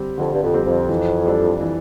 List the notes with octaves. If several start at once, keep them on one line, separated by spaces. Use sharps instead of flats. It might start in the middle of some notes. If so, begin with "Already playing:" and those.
Already playing: D3 G3 C4 G4
F2 D3
G2
F2
G3 C4 G4
F2
E3
G3 D4 A4
E3